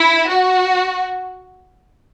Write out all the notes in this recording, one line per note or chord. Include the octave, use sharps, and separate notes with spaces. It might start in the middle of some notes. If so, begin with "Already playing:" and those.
Already playing: E4
F#4